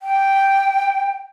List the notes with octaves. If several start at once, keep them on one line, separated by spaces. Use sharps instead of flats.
G5